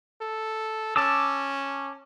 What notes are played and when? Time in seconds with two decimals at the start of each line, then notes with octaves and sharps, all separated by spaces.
0.21 A4
0.96 C#4 A5 D6 E6